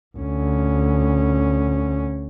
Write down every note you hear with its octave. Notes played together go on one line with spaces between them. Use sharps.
D2 C#4